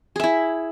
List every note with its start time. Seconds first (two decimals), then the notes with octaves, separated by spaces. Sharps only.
0.16 G#4
0.20 E5
0.24 E4